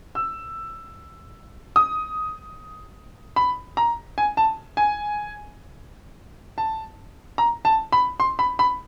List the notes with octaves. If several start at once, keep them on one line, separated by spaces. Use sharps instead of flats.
E6
D#6
B5
A#5
G#5
A5
G#5
A5
A#5
A5
B5
C6
B5
B5